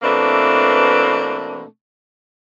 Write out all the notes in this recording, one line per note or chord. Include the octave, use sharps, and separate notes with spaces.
B2 E3 A3 A#3 C4 D4